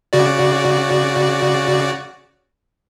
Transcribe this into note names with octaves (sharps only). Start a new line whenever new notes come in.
C#3 F#4 D5